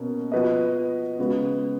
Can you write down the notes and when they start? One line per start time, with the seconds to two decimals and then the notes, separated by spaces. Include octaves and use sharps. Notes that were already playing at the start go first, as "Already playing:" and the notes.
Already playing: B2 A#3 C#4
0.32 F3 B3 F#4 B4 D#5
1.18 C#3 G#3 B3 F#4